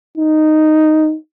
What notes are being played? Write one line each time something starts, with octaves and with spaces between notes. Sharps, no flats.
D#4